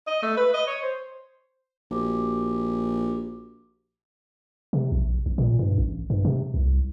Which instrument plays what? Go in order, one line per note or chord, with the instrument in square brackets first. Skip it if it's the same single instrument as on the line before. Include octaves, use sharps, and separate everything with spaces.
[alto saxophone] D#5
A3
B4
D#5
C#5
C5
[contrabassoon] A#1 [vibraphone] F#4 G4 D6
[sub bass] C3
A#1
A1
A#2
G2
A1
G2
C3
C2